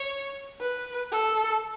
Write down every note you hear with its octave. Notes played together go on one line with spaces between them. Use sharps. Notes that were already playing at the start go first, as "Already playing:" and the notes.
Already playing: C#5
B4
A4